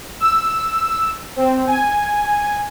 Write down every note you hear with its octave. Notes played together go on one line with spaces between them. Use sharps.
E6
C4
G#5